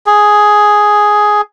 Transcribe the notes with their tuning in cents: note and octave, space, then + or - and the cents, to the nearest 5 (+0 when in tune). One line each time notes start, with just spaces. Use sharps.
G#4 +5